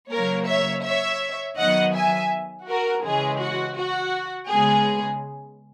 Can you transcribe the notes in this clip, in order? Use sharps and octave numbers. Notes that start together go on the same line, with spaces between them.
C#3 F#3 A#3 A#4 C#5
C#5 E5
C#5 E5
D#3 F#3 B3 D#5 F#5
E5 G#5
F#4 A#4
C#3 E3 G#3 G#4
F#4
F#4
C#3 G#3 B3 G#4